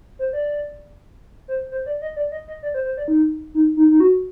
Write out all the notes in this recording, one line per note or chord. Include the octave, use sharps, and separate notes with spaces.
C5
D5
C5
C5
D5
D#5
D5
D#5
D#5
D5
C5
C5
D5
D#4
D#4
D#4
D#4
F#4